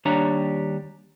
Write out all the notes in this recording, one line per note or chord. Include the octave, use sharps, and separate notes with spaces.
D#2 G3 D4 C#5 A#5